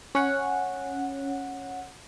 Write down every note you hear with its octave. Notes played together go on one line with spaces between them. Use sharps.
C#4 F#5